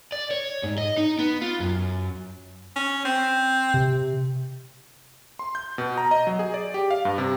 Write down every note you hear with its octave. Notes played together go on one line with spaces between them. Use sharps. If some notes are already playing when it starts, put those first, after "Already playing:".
D5
C#5
G#2
D#5
D#4
B3
F4
F#2
C#4
C4
C3
C6
G6
B2
A#5
D#5
F#3
G#4
D5
G4
F5
G2
C3